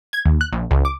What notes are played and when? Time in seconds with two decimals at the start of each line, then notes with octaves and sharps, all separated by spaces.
0.13 G#6
0.25 D#2
0.41 F#6
0.53 A#1
0.71 C#2
0.85 D6